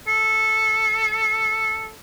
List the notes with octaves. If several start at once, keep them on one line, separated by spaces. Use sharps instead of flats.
A4